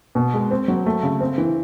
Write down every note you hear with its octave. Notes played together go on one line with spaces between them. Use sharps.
B2
G#3
C4
F#3
A3
C#3
C4
E3